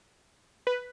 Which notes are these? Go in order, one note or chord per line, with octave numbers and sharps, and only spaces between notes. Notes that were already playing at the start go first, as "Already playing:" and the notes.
B4